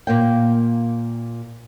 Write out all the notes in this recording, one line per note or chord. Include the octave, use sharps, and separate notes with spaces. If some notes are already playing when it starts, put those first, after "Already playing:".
A#2 A#3 G5